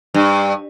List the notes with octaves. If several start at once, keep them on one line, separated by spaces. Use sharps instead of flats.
G2